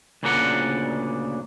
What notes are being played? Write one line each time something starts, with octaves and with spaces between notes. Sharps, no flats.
D2 A#2 C#3 D4 A#4 F#5